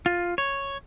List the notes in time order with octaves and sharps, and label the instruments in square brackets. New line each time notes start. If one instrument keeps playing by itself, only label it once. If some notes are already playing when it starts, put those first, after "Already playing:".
[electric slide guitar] F4
C#5